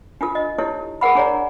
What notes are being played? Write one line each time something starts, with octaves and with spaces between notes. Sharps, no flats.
D4 F4 A4
D#5
D#4 E4 G4 A4 C#5
G#4 A#4 F#5 B5
D4 G#4 C#5 D5 A#5